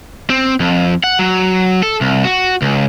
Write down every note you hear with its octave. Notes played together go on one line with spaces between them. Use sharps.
C4
F2
F#5
F#3
A4
C2
F#4
C#2